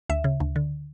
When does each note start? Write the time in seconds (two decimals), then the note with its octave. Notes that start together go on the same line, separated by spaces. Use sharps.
0.09 D2 E5
0.24 C#3
0.40 D2
0.56 D3